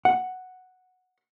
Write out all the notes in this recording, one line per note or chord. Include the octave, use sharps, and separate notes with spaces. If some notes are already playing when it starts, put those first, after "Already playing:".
F#5